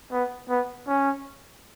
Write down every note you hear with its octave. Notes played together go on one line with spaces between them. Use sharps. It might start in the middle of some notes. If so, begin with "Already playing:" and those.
B3
B3
C#4